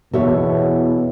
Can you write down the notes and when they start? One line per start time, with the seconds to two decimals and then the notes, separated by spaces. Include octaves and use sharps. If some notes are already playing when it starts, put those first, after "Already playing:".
0.13 E2 B2 E3 A4 C#5 E5